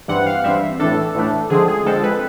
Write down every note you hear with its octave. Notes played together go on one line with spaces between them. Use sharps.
G2 E3 G3 C4 F#5
F5
G2 E3 G3 C4 E5
A2 E3 A3 D4 A4
A2 E3 A3 D4
D3 F3 G#3 C4 G#4
G#4
D3 F3 G#3 C4 A4
B4